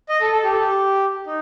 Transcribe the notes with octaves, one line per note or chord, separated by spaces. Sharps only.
D#5
A4
A4
G4
A4
G4
D#4